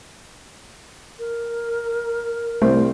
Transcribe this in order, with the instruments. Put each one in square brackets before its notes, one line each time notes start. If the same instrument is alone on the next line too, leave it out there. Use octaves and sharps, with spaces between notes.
[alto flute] A#4
[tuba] C2 [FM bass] A3 [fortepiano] C4